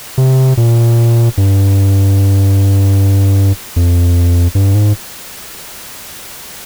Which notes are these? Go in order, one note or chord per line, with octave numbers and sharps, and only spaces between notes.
C3
A#2
G2
F2
G2
G#2